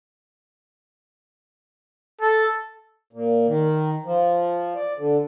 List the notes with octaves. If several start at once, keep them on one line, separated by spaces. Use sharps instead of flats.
A4
A#2
D#3
F3
D5
D3